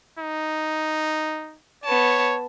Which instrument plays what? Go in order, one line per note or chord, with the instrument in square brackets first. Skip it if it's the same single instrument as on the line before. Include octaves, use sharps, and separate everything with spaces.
[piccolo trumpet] D#4
[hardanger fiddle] B3 A5 [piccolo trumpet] C#5